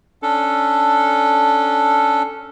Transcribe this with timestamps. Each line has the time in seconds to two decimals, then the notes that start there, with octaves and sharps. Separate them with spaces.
0.22 C#4 D4 A4